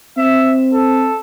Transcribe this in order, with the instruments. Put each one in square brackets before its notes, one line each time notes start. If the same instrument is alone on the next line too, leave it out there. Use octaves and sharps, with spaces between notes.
[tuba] C4 [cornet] E5
[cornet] A4